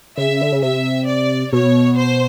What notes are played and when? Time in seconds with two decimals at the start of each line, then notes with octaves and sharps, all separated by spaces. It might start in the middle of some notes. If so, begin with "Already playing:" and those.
0.17 C#3 E5
0.41 D3
0.52 C#3
0.62 C3 E5
1.07 D5
1.52 B2 C#5
1.97 C5